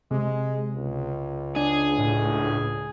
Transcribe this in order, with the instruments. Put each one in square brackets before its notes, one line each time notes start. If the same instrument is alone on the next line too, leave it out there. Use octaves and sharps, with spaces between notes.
[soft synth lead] C3 [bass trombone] G#3
[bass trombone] C#2
[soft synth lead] D4 [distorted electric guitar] G#4
[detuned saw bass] A2